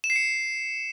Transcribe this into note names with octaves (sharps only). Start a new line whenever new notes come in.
E7
C7
C#7